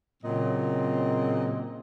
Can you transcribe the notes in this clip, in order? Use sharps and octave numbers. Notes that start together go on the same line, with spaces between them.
A#2 C#3 F#3 C4 D#5